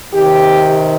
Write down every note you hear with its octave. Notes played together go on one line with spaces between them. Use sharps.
C3 D#3 G4